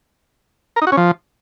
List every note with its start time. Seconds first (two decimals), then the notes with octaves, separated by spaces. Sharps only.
0.76 A#4
0.82 D#4
0.87 F#4
0.92 C#4
0.97 F3